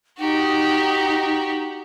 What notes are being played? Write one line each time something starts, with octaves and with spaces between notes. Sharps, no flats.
D#4 F#4 G4